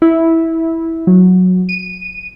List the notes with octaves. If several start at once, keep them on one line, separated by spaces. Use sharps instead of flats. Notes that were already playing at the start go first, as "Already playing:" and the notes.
E4
F#3
D#7